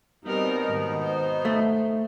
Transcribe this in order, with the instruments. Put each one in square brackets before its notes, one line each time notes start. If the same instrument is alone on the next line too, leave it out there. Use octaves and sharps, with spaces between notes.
[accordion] B2 B3 D#4 [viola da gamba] G3 C4 A#4
[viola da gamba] G#2 D#3
C5
[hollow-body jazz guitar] A3